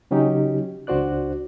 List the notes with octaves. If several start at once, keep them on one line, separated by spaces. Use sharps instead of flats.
C#3 F#3 C#4 D#4 G4
C#2 D4 F#4 C5 D5 F#6